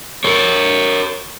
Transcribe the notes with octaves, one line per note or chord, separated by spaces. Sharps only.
A#4 C#5